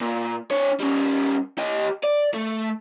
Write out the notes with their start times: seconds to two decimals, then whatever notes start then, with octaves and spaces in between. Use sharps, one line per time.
0.01 A#2
0.51 D4 C#5
0.80 G3 C#4
1.58 G4 D#5
2.03 D5
2.34 A3